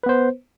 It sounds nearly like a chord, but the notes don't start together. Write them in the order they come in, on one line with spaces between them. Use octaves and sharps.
B4 B3 C5